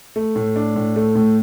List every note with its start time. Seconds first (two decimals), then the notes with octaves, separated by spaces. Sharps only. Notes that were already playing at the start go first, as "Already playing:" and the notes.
0.16 A3
0.36 A2
0.56 D4
0.76 A2
0.96 A3
1.16 A2